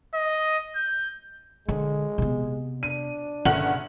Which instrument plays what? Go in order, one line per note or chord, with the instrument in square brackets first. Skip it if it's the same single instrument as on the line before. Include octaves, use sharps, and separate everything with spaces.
[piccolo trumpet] D#5
G6
[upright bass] D3 [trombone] G#3
[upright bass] C3 B3
[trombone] D4 [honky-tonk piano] D#7
[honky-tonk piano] G1 F#5 F#7 [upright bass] C#3